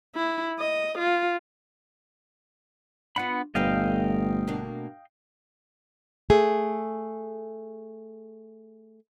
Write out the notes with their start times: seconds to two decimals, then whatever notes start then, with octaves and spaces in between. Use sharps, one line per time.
0.15 E4
0.59 D#5
0.98 F4
3.16 B3 D4 F4 F#5 B5
3.55 G1 A#2 A3 B4 D#5 F5 G5
4.48 B2 A#3 D4
6.30 A3 G#4